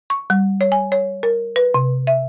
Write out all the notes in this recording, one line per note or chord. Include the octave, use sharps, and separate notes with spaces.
C#6
G3
C#5
G#5
C#5
A#4
B4
C3
E5